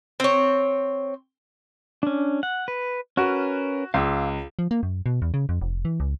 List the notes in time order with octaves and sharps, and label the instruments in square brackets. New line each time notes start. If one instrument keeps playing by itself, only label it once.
[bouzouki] C4 C#5
[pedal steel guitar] C#4 D4
F#5
B4
[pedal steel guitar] C#4 A#4 B4 [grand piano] F#4
[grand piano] C#2 [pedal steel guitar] F5 D6 E6
[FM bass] F3
A#3
F#2
B2
E2
C#3
F2
F1
E3
C#2